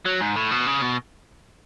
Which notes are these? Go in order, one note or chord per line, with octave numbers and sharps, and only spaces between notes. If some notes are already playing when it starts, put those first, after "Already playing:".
F#3
G#2
A2
B2
C#3
B2